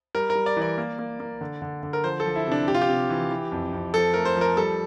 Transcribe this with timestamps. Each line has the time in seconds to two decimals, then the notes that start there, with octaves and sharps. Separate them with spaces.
0.15 G3 A#4
0.30 A#4
0.35 G3
0.46 D5
0.57 E3 D5
0.78 A#3
0.99 A#3
1.20 A#3
1.41 D3
1.62 D3
1.83 D3
1.93 A#4
2.04 F3 C5
2.20 A4
2.26 F3
2.36 E4
2.47 C3 D4
2.68 C3 G4
2.74 F4
2.81 G4
2.89 C3
3.10 E3
3.31 E3
3.52 F2
3.73 F2
3.94 F3 A4
4.14 A3 A#4
4.25 C5
4.36 F3
4.41 A#4
4.57 G3 A4